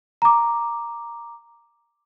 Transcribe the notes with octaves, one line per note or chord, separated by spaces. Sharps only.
A#5 D6